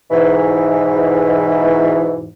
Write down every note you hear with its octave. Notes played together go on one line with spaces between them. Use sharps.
E2 G#2 B2 E3